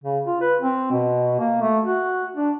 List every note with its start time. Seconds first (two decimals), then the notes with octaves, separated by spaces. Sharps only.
0.04 C#3
0.26 F4
0.41 B4
0.62 C4
0.91 B2
1.39 A#3
1.61 A3
1.85 F#4
2.36 D4